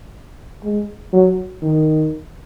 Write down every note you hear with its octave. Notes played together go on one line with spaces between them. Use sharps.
G#3
F#3
D#3